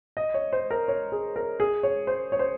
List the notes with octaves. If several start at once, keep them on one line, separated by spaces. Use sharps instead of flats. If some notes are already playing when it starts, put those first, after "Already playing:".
D#5
C#5
C5
A#4
C#5
G#4
A#4
G#4
C#5
C5
C#5
C5